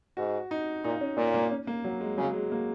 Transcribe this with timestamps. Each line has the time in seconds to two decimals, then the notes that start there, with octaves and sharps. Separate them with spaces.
0.17 G#2 F#4
0.51 D#4
0.84 A#2 D#4
1.01 C#4
1.17 A#2 A#3
1.34 A#3
1.52 C#4
1.67 A#3
1.85 F#3
2.01 G#3
2.18 C#3 F#3
2.34 G#3
2.52 A#3